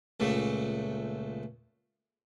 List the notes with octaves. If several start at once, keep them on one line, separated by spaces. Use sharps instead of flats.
C#2 A#2 C#3 A3